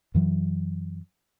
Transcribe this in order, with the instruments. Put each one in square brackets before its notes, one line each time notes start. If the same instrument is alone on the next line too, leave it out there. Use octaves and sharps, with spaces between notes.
[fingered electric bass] F#2 E3 F#3